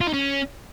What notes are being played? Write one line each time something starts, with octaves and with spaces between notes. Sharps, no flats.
F4
D#4
C#4